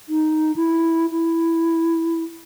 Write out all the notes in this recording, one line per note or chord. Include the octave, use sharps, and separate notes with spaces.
D#4
E4
E4